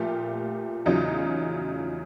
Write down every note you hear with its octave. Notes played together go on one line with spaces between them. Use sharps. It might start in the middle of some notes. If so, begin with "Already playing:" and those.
Already playing: A#2 F3 A3 F4 G4
E2 C#3 F#3 D#4 F4